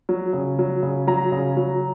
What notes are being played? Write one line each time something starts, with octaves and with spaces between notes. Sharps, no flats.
F#3
C#3
F#3
C#3
F#3 A#5
C#3
F#3